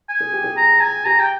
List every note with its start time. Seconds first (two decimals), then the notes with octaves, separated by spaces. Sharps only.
0.09 G#5
0.20 G#4
0.32 G4
0.44 G#4
0.57 A#5
0.81 G#5
1.05 G4 A#5
1.20 G5